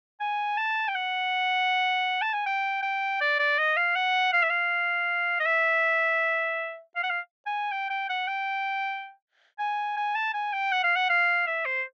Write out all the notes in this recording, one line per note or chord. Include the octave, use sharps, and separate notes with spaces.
G#5
A5
G5
F#5
A5
G#5
G5
G5
D5
D5
D#5
F5
F#5
F5
E5
F5
D#5
E5
F5
F#5
F5
G#5
G5
G5
F#5
G5
G#5
G#5
A5
G#5
G5
F#5
F5
F#5
F5
E5
C5